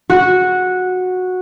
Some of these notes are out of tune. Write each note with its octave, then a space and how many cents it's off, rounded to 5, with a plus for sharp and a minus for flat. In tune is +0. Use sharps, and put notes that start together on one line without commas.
F#4 -10